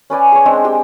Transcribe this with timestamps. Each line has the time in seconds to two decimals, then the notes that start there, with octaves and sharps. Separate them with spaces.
0.10 C#4 B4 D5 G#5
0.32 G#4 C#5
0.45 G#3 C4 D4
0.65 G4 G5